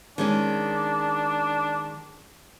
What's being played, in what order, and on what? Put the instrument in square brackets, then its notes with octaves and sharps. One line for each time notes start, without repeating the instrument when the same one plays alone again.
[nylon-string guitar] D#3 G#3 C#4 [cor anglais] D4